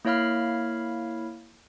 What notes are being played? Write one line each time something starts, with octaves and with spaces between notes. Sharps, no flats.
A#3 E4 C#5 F5 B5 F6